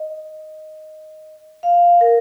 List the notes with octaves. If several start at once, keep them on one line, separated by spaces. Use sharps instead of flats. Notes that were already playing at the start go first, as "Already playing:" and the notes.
Already playing: D#5
F5
A#4